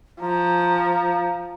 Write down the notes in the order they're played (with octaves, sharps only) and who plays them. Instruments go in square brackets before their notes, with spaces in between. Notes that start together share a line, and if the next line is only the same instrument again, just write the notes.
[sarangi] F3 [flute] A#5